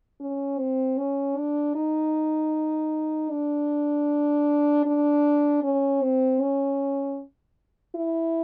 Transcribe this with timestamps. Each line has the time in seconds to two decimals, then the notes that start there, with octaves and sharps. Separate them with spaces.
0.20 C#4
0.59 C4
0.98 C#4
1.37 D4
1.75 D#4
3.31 D4
4.86 D4
5.62 C#4
6.02 C4
6.40 C#4
7.95 E4